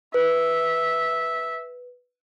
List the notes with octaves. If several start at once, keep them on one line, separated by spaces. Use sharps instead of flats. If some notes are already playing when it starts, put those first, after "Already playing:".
B4 E5